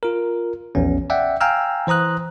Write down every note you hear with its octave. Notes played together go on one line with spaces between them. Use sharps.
F4 A#4
A#1 E2 C#4
D5 E5 F#5 G5
F5 G5 G#5 A#5 E6 F6
E3 C5 A#5 D#6 F#6